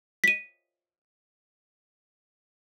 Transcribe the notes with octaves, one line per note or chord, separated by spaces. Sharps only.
B6 D#7